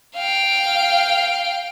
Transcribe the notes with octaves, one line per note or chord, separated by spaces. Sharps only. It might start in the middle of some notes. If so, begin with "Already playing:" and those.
F5 G5